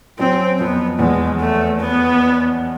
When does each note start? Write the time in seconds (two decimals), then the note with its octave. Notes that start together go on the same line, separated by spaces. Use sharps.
0.18 F#2 C4
0.59 F2 B3
0.99 E2 G#3
1.40 A3
1.80 B3